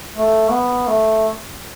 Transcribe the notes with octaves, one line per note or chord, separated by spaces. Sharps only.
A3
B3
A3